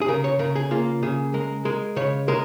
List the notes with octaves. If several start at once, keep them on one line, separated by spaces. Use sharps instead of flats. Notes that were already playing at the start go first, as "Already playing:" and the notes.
G#4
C#3 A#4
C#5
C#3 A#4
G#4
A#3 F4
C#3 G#4
G#3 A#4
G#3 A#4
C#3 C#5
G#3 A#4